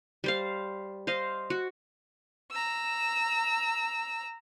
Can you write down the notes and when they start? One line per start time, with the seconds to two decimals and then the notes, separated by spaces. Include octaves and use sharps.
0.24 G3 C5 F5
1.07 C5 D#5 F5
1.50 F#4
2.51 A#5 E6